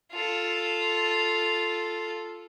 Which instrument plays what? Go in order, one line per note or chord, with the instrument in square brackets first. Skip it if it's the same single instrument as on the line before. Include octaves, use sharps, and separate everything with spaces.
[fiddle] F4 A4